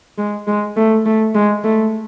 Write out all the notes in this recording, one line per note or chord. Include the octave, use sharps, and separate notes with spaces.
G#3
G#3
A3
A3
G#3
A3